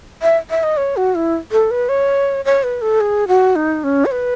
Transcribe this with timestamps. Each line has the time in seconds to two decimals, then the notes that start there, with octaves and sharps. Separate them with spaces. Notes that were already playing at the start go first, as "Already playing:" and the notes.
0.22 E5
0.50 E5
0.63 D#5
0.77 C#5
0.97 F#4
1.15 E4
1.52 A4
1.71 B4
1.89 C#5
2.45 C#5
2.63 B4
2.82 A4
3.00 G#4
3.28 F#4
3.56 D#4
3.84 C#4
4.05 C#5
4.11 B4